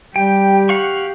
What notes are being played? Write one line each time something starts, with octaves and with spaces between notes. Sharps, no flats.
G3 G4 G5
F5 F#5 C#6